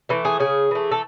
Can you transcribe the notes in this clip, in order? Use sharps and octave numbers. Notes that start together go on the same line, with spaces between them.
E3 A3
G#4
C#3 G#4
E3 A3
A4